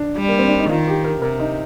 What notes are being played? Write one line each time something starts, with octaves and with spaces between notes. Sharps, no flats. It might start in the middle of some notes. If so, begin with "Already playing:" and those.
Already playing: D4
G3
A#3
C4
D4
D#4
D#3 F4
G4
A#4
C3 A#4
D#4